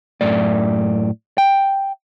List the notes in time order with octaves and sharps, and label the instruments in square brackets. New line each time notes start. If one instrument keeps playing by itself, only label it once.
[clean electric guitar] F#2 A2 D5
G5